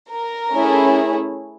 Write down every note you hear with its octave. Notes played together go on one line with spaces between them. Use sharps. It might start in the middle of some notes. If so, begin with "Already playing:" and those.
A#4
A3 C#4 E4 G#4